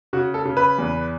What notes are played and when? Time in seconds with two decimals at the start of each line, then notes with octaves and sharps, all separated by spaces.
0.13 C#3 F#4
0.34 A4
0.45 C#3
0.57 B4
0.78 E2